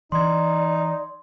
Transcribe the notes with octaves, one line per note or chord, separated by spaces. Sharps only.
E3 D#4 D5 C6 G#6